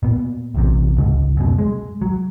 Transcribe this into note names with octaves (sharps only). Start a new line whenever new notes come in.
A#2 B3
A#1 E2 C3
G1 C#2 G#2
F#2 B2
G#3
F#3